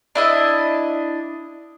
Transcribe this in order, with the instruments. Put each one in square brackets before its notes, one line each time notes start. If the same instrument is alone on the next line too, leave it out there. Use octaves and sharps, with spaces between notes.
[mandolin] D4 E4 D#5